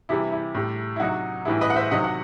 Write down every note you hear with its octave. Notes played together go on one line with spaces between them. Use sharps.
C3 E3 G3 E4 G4
E4
A2 G3
E4
C3 F#3 D#4 F#4
A2 E3 G3 E4
B4 D#5
F#5
C5 E5
C3 D#3 F#3 D#5 F#5
F#5